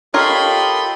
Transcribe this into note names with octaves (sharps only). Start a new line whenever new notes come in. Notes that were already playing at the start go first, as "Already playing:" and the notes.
F4 G4 A4 A#4 C#5 D#5 B5 C6